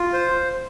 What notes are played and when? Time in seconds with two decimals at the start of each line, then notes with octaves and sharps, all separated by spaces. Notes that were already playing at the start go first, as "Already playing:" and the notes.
Already playing: F4
0.13 C5